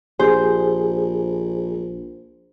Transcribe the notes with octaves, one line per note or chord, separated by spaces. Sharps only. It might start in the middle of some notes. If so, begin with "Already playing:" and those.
A#1 G4 G#4 C5